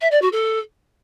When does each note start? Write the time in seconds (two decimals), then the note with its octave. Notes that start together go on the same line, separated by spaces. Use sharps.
0.01 E5
0.11 D5
0.22 F#4
0.32 A4